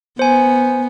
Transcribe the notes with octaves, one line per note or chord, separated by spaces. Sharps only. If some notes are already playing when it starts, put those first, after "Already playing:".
B3 C5 G#5